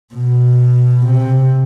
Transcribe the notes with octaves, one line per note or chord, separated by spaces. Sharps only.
B2
C3